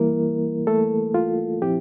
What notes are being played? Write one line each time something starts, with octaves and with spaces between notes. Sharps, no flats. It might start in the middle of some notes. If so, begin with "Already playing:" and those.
Already playing: E3 G3 A#3 E4 A#4
A3 A4
F4
A#2 F3 C4 E4 G4